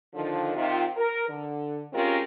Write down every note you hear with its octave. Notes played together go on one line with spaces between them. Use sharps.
D3 D#3 F3
C3 D#3 F4
A#4
D3
G#3 C4 C#4 F4 G4 A#4